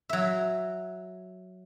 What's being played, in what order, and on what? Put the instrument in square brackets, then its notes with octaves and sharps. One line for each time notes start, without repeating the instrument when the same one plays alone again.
[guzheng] F#3 E5